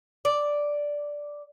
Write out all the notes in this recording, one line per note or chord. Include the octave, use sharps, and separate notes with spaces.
D5